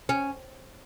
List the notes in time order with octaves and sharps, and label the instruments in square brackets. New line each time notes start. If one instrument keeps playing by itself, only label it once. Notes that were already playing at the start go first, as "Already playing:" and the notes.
[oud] C#4